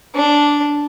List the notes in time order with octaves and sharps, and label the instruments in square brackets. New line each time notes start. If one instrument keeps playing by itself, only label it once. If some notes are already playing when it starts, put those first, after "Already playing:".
[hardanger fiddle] D4